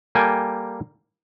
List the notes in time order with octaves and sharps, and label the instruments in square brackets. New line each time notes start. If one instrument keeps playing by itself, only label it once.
[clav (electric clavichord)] G3 A#3 A4 G5 G#5